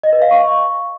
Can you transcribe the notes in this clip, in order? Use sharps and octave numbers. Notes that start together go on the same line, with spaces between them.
D#5
B4
F5
C#6